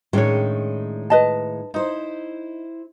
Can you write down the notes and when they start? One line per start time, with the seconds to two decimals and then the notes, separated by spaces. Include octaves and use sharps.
0.13 A2 D#3 G#3 C#4 D4 C#5
1.10 B4 D#5 A5
1.74 D#4 E4 C5